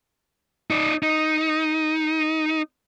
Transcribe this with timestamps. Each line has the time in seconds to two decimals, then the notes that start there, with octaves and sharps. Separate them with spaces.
0.70 D#4 D5
1.03 D#4